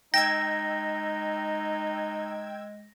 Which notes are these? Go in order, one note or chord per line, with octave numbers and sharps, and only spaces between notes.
G#3 D#4 G5 E6 G#6 A#6